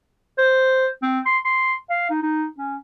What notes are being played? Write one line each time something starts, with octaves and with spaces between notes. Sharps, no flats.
C5
C4
C6
C6
F5
D#4
D#4
C#4